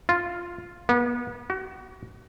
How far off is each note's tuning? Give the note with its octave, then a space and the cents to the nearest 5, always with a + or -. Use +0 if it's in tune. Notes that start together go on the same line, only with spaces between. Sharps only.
F4 +0
B3 -35
F#4 +35